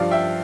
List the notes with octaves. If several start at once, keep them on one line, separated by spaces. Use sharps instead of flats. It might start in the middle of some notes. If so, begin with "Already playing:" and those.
Already playing: G2 F3 D5 F5
E5 G5